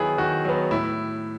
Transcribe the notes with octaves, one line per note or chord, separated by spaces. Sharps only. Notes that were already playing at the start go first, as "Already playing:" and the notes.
Already playing: D#3 F#3 B3 E4 G#4
D#3 F#4
F#3 B3
A2 E4